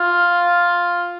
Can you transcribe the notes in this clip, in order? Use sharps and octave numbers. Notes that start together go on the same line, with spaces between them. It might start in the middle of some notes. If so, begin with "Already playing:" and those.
Already playing: F4